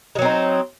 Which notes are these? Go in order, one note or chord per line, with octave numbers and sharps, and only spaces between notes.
F#3 G#3 C4 D#4